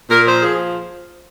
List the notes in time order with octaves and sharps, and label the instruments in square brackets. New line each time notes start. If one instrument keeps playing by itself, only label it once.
[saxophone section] A#2 A#4
F3 C5
F3 G#4